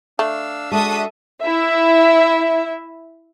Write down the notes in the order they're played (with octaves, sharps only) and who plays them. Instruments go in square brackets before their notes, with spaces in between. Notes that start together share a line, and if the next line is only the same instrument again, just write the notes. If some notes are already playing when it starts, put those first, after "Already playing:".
[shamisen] A3 [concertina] D4 F5 E6
[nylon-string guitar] G#3 [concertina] D4 F#4 [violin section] A4 E5 D#6
[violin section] E4 E5